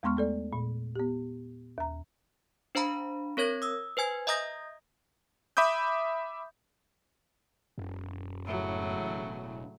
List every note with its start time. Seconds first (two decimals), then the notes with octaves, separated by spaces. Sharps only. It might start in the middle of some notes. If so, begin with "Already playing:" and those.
0.03 E2 G#3 B3 C6 C#6 F6
0.17 A3 A4 D5
0.53 A#2
0.95 B3 G4
1.78 D#2 A#5
2.75 D4 C5 F5 A#5 B5
3.37 C4 A#4 C#5 G#6 A#6
3.62 D#6 E6
3.97 B4 C5 G#5 G#6
4.27 D#5 E5 A#5 D#6 G6 A#6
5.57 E5 B5 D6 D#6 G6
7.78 E1 F#2
8.46 A2 C#3 F#3